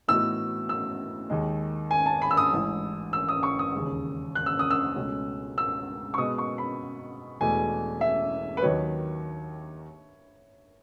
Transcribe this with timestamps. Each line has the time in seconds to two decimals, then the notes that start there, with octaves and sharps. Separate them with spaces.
0.08 A2 E3 B3 D#4 F#4 E6
0.69 E6
1.30 D#2 D#3 G#3
1.91 G#5
2.06 A5
2.22 B5
2.31 E6
2.37 D#6
2.52 A1 G#2 E3
3.13 E6
3.29 D#6
3.43 C#6
3.59 D#6
3.74 E1 D#2 C#3
4.35 F#6
4.46 E6
4.59 D#6
4.71 E6
4.96 C#2 B2 A3 C#4
5.58 E6
6.14 C#6
6.18 B2 G#3 B3 D#6
6.38 C#6
6.58 B5
7.40 E1 E2 B2 A3 G#5
8.01 E5
8.57 B4
8.62 D#2 D#3 F#3 C#5